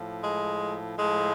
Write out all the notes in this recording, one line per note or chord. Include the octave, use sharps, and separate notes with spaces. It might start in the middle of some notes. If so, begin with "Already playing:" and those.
Already playing: A2 F3
G#3
A2 F3 G#3